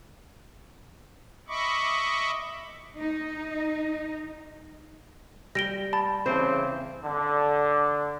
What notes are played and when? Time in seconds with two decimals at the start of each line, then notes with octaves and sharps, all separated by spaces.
1.48 D#5 E5 B5 C#6 D6
2.99 D#4
5.55 G3 A#6 D7 G7
5.93 A5 B5 A6
6.26 C#3 E3 C4 C5
7.04 D3